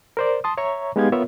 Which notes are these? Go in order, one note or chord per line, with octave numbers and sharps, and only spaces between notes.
A#4 C5 D5
A5 C6 D#6
C#5 E5 A#5 C#6
G#3 B3 D#4 G4 F5 G#6
B3 F4 A#4 C#5 E5